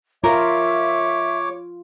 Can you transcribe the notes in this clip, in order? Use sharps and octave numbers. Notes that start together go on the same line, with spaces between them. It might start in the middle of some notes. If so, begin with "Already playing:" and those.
F4 A#4 C#5 E5 D6